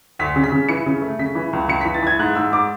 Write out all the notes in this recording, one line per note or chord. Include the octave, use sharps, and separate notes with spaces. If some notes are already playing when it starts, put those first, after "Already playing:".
D2 B6
C#3
B6
C#3
E3 C#7
C#3
A3
C#3 B6
E3
C#2
C#2 C#7
B6
E3
A6
E3 G#6
G#2 F#6
G#2 E6
G#2 D6